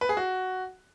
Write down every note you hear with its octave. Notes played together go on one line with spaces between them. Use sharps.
B4
G#4
F#4